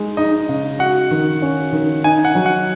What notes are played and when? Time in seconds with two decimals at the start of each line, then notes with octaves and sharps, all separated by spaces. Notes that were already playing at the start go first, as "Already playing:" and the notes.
Already playing: G#3 D#4
0.17 D#4 D#5
0.49 C#3
0.79 F#4 F#5
1.11 D#3
1.42 C#4
1.72 D#3
2.04 D#4 G#5
2.25 F#5
2.35 F#3
2.46 F#5